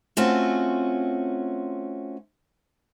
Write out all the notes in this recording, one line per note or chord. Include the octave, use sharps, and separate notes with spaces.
A3 C4 C#4 F4 F#4